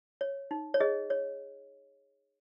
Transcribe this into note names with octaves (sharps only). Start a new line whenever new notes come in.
C#5
D#4
C#5
G#4 D#5
C#5